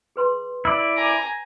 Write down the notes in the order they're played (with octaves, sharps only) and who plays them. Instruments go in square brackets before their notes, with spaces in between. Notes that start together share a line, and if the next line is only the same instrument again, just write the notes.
[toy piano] G#4 B4 C6
[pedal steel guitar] E4 D5
[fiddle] G#5 A#5